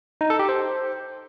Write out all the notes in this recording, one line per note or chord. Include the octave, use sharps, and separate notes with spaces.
D#4
A4
G4
C5